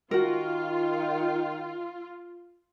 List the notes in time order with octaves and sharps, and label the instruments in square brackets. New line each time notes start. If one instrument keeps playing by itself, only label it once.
[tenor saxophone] D#3 [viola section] F4 [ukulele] F#4 A#4